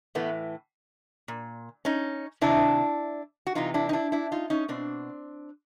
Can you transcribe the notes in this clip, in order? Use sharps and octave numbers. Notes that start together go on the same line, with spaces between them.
A2 E3 A3 B3
A#2
C#4 D#4
C3 D#3 D4 E4
F#4
C3 E3 D#4 F4
D4 E4
D#4
D4 E4
D4 E4
D#4 F4
C#4 D#4
B2 C4 D4